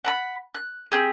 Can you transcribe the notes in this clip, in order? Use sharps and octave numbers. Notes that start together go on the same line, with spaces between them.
F#5 A#5 B5
F#6
C4 G4 G#4